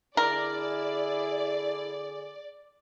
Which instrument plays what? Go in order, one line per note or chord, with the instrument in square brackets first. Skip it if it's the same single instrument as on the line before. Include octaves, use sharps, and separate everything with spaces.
[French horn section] D3 G#4 [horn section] E4 [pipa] A#4 [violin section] D5